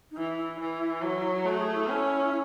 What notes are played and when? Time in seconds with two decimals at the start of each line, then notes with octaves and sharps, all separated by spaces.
0.11 D#4
0.17 E3 E4
0.38 E4
0.60 E3
1.02 F#3
1.45 A3 F#4
1.59 G#4
1.74 E4
1.88 C#4